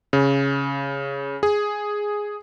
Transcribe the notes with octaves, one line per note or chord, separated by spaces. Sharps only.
C#3
G#4